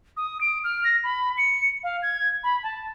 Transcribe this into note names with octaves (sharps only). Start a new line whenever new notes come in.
D#6
D7
F6
A#6
B5
C#7
F5
G#6
B5
A5